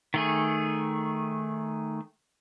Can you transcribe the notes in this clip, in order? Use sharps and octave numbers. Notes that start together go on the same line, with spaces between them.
D#3 A3 G#4